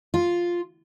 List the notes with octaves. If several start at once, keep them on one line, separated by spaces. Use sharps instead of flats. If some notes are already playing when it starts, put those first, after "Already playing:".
F4